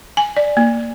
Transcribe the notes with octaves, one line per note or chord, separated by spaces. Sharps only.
G#5
D5
A#3